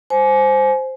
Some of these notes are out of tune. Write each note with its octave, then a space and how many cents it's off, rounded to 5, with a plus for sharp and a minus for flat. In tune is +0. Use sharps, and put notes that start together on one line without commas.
C5 +0 G#5 +30